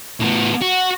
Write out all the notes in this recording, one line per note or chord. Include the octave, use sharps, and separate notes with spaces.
A2 B3
F#4